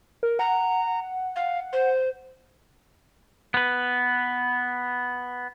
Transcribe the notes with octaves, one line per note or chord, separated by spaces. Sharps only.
A#4
F#5 A#5
F5
C5
B3 B4